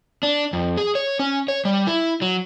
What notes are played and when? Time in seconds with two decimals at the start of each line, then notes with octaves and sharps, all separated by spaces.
0.23 D4
0.53 F2
0.77 G#4
0.95 C#5
1.19 C#4
1.48 C#5
1.65 G3
1.87 E4
2.22 F#3